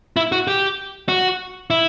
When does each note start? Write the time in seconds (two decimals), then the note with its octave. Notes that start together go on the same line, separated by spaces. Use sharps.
0.17 E4
0.32 F#4
0.47 G4
1.09 F#4
1.70 E4